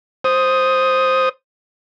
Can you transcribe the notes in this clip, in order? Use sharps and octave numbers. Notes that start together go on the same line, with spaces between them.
C5 D#6